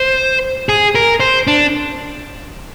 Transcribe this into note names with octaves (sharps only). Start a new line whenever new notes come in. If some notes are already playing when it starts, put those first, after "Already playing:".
Already playing: C5
G#4
A#4
C5
D4